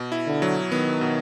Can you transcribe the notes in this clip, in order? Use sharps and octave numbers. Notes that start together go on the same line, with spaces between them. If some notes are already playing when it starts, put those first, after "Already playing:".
Already playing: B2
E4
D3
F#3
D#3 B3
B2